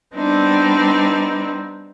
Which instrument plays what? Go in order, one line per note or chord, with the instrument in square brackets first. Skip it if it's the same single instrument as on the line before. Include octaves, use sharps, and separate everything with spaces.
[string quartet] G3 B3 C4 D4 D#4